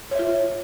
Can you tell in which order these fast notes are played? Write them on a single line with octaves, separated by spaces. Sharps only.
C#5 E5 F4